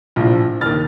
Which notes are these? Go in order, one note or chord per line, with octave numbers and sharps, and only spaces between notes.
A#1 A2 F3
D#2 D#3 F6 A6